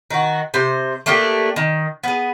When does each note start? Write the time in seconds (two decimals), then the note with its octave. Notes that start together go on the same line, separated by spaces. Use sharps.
0.10 D#3 F#4
0.54 C3 C5
1.06 A3 A#3 D4 G4
1.56 D#3
2.04 B3 G#4